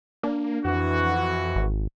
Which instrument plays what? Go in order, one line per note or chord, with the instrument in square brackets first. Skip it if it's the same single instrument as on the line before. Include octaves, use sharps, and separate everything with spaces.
[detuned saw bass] A#3 [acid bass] D4
[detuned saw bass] F2 [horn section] E3 F#4
[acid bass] G#1